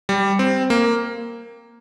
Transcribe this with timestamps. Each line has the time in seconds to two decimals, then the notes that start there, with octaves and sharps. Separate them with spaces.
0.09 G3
0.39 C4
0.70 A#3